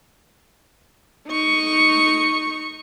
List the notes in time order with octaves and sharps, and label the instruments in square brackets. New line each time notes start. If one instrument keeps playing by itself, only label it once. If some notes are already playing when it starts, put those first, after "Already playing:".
[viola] D#4 C#6